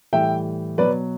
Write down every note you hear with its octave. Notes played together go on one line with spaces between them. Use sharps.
A2 E3 G3 E5 G5
B2 F#3 B4 D5